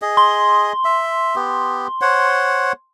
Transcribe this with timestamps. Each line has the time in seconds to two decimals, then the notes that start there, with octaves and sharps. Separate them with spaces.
0.02 G#4 D#5
0.17 C6
0.85 E5
1.36 B3 G4
2.01 C5 C#5 F#5